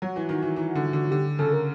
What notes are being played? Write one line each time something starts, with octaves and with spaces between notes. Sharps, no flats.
F#3 F#4
E3
D#3
E3
E3
D3
D3
D3 G4
C#3 A4
A#4